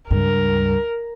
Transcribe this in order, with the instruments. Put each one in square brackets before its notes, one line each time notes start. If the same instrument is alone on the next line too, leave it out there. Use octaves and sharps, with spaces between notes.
[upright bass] C#2 G2 [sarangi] A#4